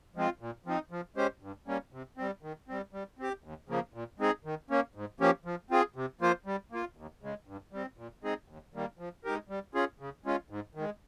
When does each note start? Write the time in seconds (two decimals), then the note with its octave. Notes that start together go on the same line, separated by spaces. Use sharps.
0.16 F3 G#3 C4 F4
0.41 A#2
0.66 F3 C4 D#4
0.91 F3
1.16 G#3 C#4 G4 C5
1.42 G2
1.67 G3 A#3 C#4
1.93 C3
2.17 G3 C4
2.43 D#3
2.68 G3 C4
2.93 G3
3.19 C4 G4
3.44 D#2
3.69 C#3 F3 A#3
3.94 A#2
4.19 G#3 C4 D#4 G#4
4.45 D#3
4.70 A#3 C#4
4.95 G#2
5.20 F3 A#3 C#4 G4
5.45 F3
5.71 C4 F4 G#4
5.96 C3
6.21 F3 A#3 F4 C5
6.46 G3
6.72 A#3 F4
6.97 D#2
7.22 C#3 G#3
7.47 G2
7.73 G3 C4
7.98 A#2
8.23 G#3 C4 D#4 G#4
8.48 D#2
8.74 D#3 G3 A#3
8.99 F3
9.24 G#3 D#4 G4 A#4
9.49 G3
9.74 C#4 F4 G#4
10.00 C#3
10.25 G#3 C#4 F4
10.50 G#2
10.75 D#3
10.80 G#3